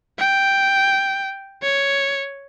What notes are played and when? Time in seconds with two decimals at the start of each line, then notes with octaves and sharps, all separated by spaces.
0.19 G5
1.63 C#5